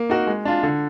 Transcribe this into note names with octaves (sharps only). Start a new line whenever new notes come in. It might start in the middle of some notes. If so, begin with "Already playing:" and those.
Already playing: A#3
D#4 F#4 A#4
G#3
D4 F4
D3